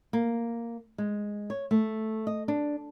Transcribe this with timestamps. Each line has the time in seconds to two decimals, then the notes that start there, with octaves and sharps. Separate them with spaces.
0.13 A#3
0.98 G#3
1.50 C#5
1.71 A3
2.27 D#5
2.48 D4